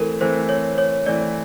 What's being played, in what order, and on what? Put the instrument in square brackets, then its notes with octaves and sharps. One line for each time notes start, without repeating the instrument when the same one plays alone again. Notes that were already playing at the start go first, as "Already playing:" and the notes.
Already playing: [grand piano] E3 A3 C4 [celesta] A4 A#4
[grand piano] E3 A3 C4 [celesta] C5
[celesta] C#5
C#5
[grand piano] E3 A3 C4 [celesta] D5